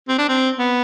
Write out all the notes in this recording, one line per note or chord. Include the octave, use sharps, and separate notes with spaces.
C4
D4
C4
B3